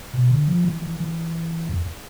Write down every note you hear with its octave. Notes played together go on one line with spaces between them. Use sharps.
B2
D3
F3
E3
E3
E3
F2